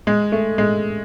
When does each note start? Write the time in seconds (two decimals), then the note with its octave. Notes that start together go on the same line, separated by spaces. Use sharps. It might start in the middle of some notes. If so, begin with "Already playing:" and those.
0.07 G#3
0.32 A3
0.58 G#3